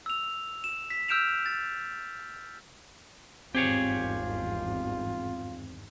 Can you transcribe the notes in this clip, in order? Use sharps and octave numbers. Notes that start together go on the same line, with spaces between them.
E6 F7
E7
B6
E6 F6 G6 D7 E7 F7
A6
G#1 E2 G2 C4 F4 G4 G#4 C#5